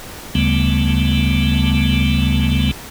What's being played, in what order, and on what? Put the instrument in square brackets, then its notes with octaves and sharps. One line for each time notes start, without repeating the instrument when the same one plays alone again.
[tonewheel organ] D2 C#3 G3 A3 B3